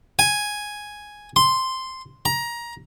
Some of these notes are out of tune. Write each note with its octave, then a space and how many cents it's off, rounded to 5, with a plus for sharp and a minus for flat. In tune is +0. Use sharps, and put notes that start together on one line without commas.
G#5 +0
C6 -5
A#5 +20